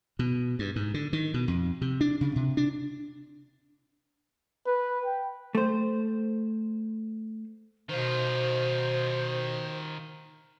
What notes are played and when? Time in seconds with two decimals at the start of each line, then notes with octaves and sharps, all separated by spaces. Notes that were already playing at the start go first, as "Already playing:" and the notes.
0.19 B2
0.59 G2
0.76 G#2
0.94 D3
1.13 D#3
1.34 B2
1.48 F2
1.81 C3
2.01 D4
2.21 C#3
2.36 C3
2.57 D4
4.66 B4
5.06 G5
5.55 A3 C5
7.89 B2 D#3 F4 C5